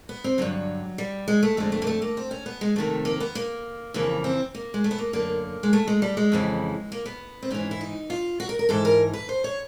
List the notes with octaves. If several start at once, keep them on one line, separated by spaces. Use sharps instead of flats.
B3
C4
G2 D3 F#3
G3
G#3
A3
F2 D3 G#3
A3
A#3
A3
A#3
C4
C#4
B3
G#3
F2 C3 D#3 A3
A#3
B3
A#3
F2 C#3 E3 A#3
C4
A#3
G#3
A3
B3
A#3
F#2 D3 A#3
G#3
A3
G#3
G3
G#3
F2 C#3 E3
A#3
B3
C4
G#2 E3 C#4
E4
D#4
F4
F#4
A#4
A#4
G#2 E3 A4
A#4
B4
C5
C#5